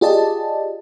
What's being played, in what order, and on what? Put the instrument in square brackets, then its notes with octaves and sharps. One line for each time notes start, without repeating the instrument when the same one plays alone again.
[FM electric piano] F4 G4 G#4 D5 D#5 A5